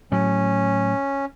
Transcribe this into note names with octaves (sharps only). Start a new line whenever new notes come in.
A2 F#3 C#4